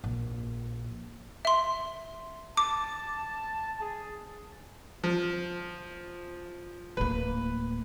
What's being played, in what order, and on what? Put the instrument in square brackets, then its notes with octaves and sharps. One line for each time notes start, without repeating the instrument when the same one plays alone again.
[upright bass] A#1
[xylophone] E5 C6
[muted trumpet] A5 [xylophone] D6
[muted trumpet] G#4
[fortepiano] F3
[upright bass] D1 A#3 [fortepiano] B4